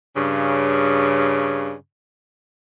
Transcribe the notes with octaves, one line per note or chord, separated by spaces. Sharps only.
G2 C#3